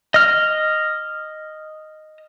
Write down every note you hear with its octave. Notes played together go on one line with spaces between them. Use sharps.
D#5 F6